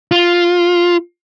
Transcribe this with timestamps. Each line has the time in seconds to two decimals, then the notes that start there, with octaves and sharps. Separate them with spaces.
0.11 F4